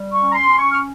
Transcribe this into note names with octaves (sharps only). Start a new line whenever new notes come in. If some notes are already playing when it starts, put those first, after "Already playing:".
Already playing: G3
C#6
C#4
A#5
C6
C#4
C#6
F6